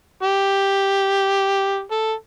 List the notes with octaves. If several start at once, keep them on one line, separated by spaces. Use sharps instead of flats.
G4
A4